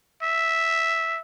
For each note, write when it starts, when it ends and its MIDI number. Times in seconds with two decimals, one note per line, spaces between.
0.22 1.20 76